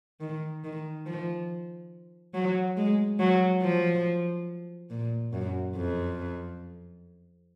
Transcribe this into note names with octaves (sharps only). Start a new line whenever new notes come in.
D#3
D#3
F3
F#3
G#3
F#3
F3
A#2
F#2
F2